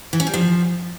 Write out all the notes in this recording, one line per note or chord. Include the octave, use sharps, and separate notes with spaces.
E3
C#4
G3
F3